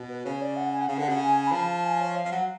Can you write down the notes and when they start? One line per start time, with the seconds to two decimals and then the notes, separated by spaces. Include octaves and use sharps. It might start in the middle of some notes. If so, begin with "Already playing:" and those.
Already playing: B2
0.09 B4
0.25 C#3 C#5
0.41 D5
0.56 F#5
0.72 G#5
0.81 F#5
0.88 C#3 F5
0.97 D3 F#5
1.09 C#3
1.20 G#5
1.37 G#5
1.47 B5
1.52 F3 A5
1.76 A5
1.84 G#5
2.00 C#5
2.16 F5
2.25 F3
2.31 F#3 F#5